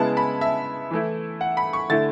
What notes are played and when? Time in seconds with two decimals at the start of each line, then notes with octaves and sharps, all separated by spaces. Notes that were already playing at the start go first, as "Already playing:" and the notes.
Already playing: C#3 G#3 B3 E4 A5
0.17 B5
0.41 E5
0.91 E3 A3 E4
1.41 F#5
1.57 B5
1.73 C#6
1.89 D3 A3 E4 A6